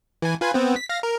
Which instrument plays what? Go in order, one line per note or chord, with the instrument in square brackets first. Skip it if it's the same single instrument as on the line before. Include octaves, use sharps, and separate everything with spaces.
[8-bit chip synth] E3 G#5
F4 B4 G#5
B3 C4
B6
F5 A#6
A#4